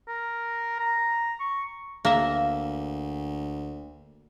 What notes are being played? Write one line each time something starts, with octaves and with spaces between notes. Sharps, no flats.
A#4
A#5
C#6
D2 A#3 E5